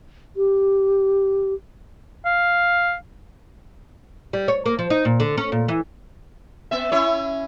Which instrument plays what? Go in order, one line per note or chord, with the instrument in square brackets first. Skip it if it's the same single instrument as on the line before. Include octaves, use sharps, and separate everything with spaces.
[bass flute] G4
[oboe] F5
[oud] G3
C#5
A#3
F3
D#4
A#2
D3
C#4
A#2
E3
[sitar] B3 E5
C#4 E4 C#5